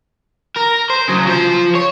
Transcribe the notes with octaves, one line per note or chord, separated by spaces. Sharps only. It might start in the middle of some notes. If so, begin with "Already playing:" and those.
A#4
C5
C#3 F#3
F3 C5
C#5